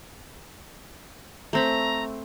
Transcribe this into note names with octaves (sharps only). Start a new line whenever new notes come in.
A3 C4 A#5 B5